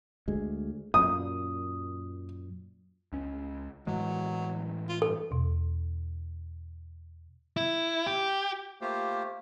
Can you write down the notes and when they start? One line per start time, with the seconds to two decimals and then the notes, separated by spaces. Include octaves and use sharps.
0.28 D2 G#3
0.94 F#2 A#2 D#6
3.12 C#2 C#4
3.87 A2 E3 F#3 G#3
4.89 F4
5.02 G2 A4
5.31 E2 B2
7.57 E4
8.07 G4
8.81 A3 A#3 F4 G4 C5